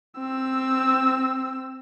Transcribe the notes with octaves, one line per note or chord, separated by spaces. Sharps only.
C4 E6